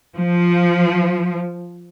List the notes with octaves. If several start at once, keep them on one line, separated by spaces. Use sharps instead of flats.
F3